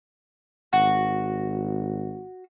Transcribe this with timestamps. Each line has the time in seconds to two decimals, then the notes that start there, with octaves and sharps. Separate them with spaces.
0.73 G#1 F#4